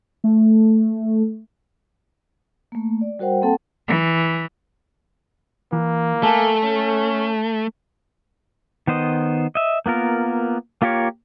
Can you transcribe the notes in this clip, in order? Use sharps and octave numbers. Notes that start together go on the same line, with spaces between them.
A3
A3 A#3
D5
G3 F#4 A#4 C5 F#5 G5
A#3 C4 A4 F#5 G5 A5
E3
E3 A#3
A3 A4 G#5 A5
C#4
D#3 B3 C5 D#5
D#5 E5
A#3 B3 F4 A#4
A#3 F4 G4 A#4 C#5